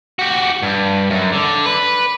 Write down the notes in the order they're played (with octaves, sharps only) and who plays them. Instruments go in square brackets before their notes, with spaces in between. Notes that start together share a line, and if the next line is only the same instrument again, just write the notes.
[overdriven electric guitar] F#4 G4
G2
F#2
D3
B4